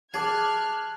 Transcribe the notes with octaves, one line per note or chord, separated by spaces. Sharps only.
G#4 A5 D6 F6 F#6 G#6